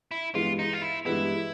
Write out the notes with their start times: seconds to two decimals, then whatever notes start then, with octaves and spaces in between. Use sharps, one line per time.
0.11 E4
0.35 G2 E3 G#3 B3 F4
0.59 D#4
0.73 F4
0.82 E4
1.05 G2 E3 G#3 B3 E4